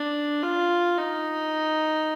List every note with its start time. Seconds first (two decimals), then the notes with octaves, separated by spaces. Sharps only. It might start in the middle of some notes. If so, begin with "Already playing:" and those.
Already playing: D4
0.42 F4
0.97 D#4